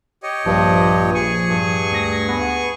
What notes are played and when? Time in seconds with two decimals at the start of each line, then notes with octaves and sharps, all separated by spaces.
0.23 G4 C#5 D#5
0.45 A#1 G2 F3
1.14 G#4 G#5 C#6
1.49 G2
1.92 D2 A#6
2.28 B3